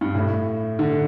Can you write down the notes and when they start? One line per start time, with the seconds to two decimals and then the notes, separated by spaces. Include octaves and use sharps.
0.01 G2
0.15 A2
0.79 D3